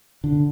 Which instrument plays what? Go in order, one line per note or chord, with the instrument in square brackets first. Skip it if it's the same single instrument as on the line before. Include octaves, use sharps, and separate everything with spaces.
[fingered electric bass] D3